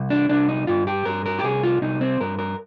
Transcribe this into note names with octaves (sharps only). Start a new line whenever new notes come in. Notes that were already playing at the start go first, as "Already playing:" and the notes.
Already playing: C2
D4
C2 D4
D#4
G2 F4
G4
G2 A#4
A#4
G4
C2 G#4
F4
C2 D#4
C4
G2 A#4
A#4